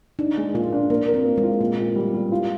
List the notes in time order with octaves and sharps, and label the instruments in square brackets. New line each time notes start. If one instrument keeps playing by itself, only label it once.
[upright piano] D4 [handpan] D#4
[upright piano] G#3
[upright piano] A#2 [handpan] F4
[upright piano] D4
[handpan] A#3 [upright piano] A#4
[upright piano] A#4
[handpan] C4
[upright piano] A#3
[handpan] G#3
[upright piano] F4
[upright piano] A#2 [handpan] A#3
[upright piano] A#2
G3
G3
F4